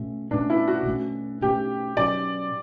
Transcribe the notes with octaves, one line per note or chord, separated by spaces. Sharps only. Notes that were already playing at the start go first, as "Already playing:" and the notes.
Already playing: B2 A3 C#4
B2 A3 C#4 D4
E4
F#4
B2 A3 C#4
B2 A3 C#4 G4
B2 F#3 C#4 D5